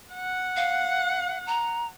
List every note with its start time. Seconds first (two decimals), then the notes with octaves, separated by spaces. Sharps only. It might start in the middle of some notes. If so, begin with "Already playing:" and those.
0.13 F#5
0.56 F5
1.47 A#5